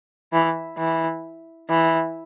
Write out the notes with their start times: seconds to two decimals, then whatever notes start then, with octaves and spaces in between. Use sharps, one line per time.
0.33 E3
0.78 E3
1.69 E3